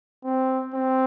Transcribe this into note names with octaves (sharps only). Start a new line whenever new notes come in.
C4
C4